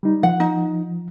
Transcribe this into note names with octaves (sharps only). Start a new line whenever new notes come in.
G3 D#4
F3 F#5
D#4